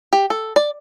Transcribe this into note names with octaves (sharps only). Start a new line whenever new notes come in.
G4
A4
D5